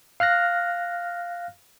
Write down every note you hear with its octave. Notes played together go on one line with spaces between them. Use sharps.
F5 F6 F#6 A#6